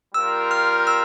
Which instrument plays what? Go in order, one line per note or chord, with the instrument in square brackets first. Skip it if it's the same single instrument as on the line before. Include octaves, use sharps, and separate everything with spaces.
[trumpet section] G3 C4 F4 A#4 [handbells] E6
[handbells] F6
E6